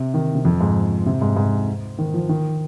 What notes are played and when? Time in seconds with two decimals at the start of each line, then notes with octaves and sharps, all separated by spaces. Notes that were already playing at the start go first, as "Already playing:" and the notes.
Already playing: C3
0.14 D#3
0.35 C3
0.45 F2
0.60 G#2
1.06 C3
1.21 G#2
1.36 G#2
1.99 D#3
2.14 F3
2.29 D#3